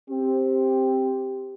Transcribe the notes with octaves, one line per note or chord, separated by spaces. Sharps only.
C4 G4